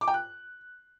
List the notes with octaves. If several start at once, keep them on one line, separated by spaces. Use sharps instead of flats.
D6
G5
F#6